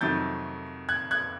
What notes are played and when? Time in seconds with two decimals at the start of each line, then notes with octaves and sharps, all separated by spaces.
0.01 F2 C3 D#3 F#3 A3 G6 A6
0.89 F#6 G#6
1.11 F#6 G#6